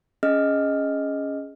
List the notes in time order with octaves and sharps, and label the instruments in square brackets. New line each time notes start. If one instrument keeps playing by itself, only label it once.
[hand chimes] C#4 G#4 D#5 F6